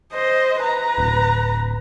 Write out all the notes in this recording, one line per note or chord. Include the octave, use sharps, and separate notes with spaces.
C5 D#5
B4 A#5
D1